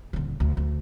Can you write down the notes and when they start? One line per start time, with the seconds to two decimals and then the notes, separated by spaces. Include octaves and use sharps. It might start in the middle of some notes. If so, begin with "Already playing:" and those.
0.13 D#1 D3
0.40 D2
0.57 D2